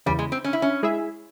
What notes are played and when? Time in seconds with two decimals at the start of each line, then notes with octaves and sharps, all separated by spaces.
0.06 E2 C#3 E3 G3
0.19 G#3
0.32 C4
0.44 C#4
0.53 E4
0.62 C#4
0.83 G#3 E4 G#4 E5